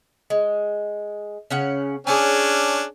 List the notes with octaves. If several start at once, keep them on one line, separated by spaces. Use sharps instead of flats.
G#3
C#3 C#4 F#5
C#4 D4 G#4 C#5 G#5